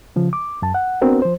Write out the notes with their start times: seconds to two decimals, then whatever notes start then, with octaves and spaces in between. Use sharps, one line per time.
0.16 C#3 F3
0.33 D6
0.62 F#2 A5
0.74 F#5
1.01 B3 C4 D4 F#4 A#4
1.22 F3 C5